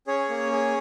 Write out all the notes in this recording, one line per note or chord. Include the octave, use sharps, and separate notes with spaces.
C#4 G#4 C#5
A#3
G#4